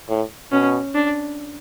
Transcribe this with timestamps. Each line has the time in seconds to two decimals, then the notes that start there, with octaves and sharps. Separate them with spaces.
0.09 A2
0.52 B2 C#4
0.95 D4